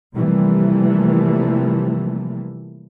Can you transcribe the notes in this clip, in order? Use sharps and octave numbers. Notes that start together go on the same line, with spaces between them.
C3 E3 F3 G3 A3 A#3